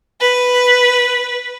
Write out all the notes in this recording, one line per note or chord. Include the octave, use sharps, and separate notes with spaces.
B4